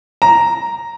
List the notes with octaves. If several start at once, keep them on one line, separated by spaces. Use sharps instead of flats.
A#5